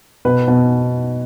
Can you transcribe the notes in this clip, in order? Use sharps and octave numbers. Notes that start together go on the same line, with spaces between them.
B2 B4
B2